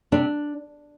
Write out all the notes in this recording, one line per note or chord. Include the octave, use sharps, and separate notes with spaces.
C3 D4